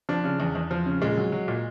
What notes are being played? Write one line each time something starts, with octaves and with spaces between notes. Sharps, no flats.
F3 D4
C#3
E2
E2
F3
C#3
A#2 G#3
F#3
F#3
A#2